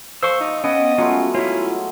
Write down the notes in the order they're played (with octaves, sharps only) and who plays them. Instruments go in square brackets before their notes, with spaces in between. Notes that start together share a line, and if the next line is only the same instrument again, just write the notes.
[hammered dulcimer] F3 [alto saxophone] C5 [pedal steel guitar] C#6 E6
[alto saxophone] D#4
[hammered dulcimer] B3 [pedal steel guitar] C#4 [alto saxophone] D#5
[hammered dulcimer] F#3 G#3 A3 [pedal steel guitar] C#4 F4
[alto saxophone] C#4 [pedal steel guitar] E4 F4